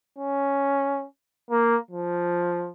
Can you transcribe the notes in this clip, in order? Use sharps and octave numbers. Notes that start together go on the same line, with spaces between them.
C#4
A#3
F3